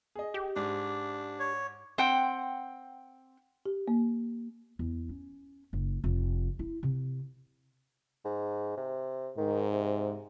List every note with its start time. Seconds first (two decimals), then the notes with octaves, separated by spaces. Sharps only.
0.15 G#4 D#5
0.34 G4
0.56 G#2 D4
1.40 C#5
1.98 C4 F#5 G5
3.66 G4
3.88 A#3
4.79 E2
5.09 C#4
5.73 F#1
6.04 F1
6.59 E4
6.83 C3
8.25 G#2
8.77 C3
9.38 G#2 D#3
9.72 C3